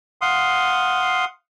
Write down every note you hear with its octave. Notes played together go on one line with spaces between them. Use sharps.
F5 F#5 C6 D#6